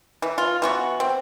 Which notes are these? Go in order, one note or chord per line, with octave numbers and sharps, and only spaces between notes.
E3
F4
E3 B3 F#4
C4